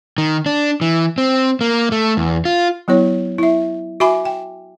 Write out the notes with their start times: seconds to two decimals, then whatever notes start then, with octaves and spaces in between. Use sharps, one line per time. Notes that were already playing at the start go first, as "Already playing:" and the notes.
0.18 D#3
0.46 D4
0.81 E3
1.18 C4
1.61 A#3
1.92 A3
2.17 E2
2.45 F4
2.88 F#3 B3 E4 C#5
3.38 E4 E5
4.00 F#4 E5 G#5 B5 D6
4.25 G5